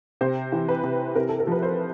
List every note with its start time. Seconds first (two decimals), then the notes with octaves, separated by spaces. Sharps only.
0.21 C3 C5
0.52 E3
0.69 B4
0.83 C3
1.15 C3 A#4
1.29 A4
1.40 A#4
1.47 F3 B4
1.63 C5